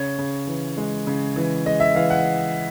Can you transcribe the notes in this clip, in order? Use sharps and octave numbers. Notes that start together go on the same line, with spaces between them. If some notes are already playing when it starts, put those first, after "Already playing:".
Already playing: C#3 C#5
C#3
E3
G#3
C#3
E3
G#3 D#5
E5
E3 F5
F#5